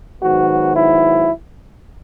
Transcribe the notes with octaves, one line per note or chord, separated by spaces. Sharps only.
G#2 D#3 F#3 B3 F#4
E4